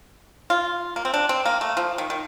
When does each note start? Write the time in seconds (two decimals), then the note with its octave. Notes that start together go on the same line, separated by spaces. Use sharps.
0.50 F4
0.96 A#3
1.05 C4
1.14 D4
1.29 C4
1.45 A#3
1.61 A3
1.77 F3
1.98 D#3
2.10 D#3